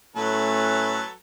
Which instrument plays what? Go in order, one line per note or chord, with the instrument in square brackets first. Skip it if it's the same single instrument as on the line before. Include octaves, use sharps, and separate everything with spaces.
[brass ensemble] A2 A3 C#4 [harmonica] F#3 A4 B4